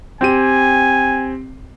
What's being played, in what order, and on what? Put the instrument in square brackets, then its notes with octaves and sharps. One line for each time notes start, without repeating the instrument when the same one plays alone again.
[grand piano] C4 G4 D#7 [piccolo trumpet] G#5